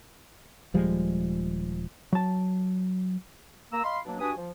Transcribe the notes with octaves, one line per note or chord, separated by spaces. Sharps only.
D#1 F3 G3 G#3
F#3 A5
A#3 A#5 E6
D#5 F5 B5 C6
B2 F#3 A#3 D4
G2 D4 F#4 B4 G#5 D#6
F3